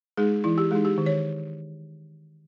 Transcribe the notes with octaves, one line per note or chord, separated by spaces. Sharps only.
G#3 D#4 G#4
E3 E4
G4
G#3 G#4
D#4
G4
D#3
C#5